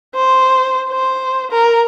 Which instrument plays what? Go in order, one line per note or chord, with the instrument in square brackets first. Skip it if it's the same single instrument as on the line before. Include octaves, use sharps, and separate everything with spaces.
[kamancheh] C5
C5
A#4